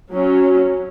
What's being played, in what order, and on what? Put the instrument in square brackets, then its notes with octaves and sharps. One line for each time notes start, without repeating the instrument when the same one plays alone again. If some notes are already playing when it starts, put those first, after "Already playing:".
[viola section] F#3 C#4